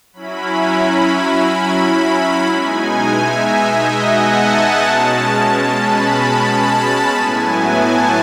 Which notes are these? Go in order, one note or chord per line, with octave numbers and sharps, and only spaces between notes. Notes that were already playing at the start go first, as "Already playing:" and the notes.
F#3 C#4 E4 B5
B5
B5
B2 G#3 D#4 G#5
E5
D#5
F#5
A5
B2 G#3 C#4 A5
A5
B5
A5
A2 F#3 B3 E4 G#5
A5